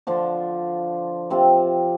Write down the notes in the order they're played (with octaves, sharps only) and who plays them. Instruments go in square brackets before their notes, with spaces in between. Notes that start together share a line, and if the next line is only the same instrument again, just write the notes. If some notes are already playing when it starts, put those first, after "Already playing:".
[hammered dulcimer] D3 F3 D4 F4
C3 F3 C4 F4